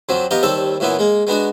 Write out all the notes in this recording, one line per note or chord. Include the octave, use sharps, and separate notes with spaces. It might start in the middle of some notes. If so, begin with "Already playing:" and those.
F2 F3 F#3 C4
B3 F4 G4 D#5 A#5
D#2 G3 C4 A4 C#5 A5
F#2 A#2 E3 B3 E4
G#3 A#3
G#3 B3 D4 F#4